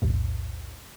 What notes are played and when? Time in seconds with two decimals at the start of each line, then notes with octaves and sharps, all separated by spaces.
0.02 B1 E2 A2